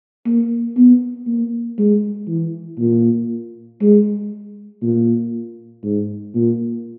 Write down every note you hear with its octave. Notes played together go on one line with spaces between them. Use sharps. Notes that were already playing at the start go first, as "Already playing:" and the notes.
A#3
B3
A#3
G#3
E3
A#2
G#3
A#2
G#2
A#2